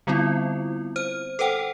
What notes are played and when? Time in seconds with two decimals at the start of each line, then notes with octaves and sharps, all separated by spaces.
0.07 D3 G3 B3 C4 E4 F4
0.96 C5 F6
1.39 A4 B4 C5 F#5 G5